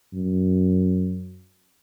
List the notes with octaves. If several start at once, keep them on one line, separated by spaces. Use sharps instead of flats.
F#2